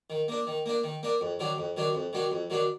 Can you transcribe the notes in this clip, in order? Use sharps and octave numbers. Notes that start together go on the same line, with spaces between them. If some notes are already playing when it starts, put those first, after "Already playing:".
D#3
A#3 D4
D#3
A#3 D4
D#3
A#3 D4
F2
D#3 F#3 D4
F2
D#3 F#3 D4
F2
D#3 F#3 D4
F2
D#3 F#3 D4